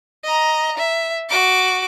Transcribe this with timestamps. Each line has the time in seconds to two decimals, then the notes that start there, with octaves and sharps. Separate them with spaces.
0.24 D#5 A#5
0.78 E5
1.29 F#4 D6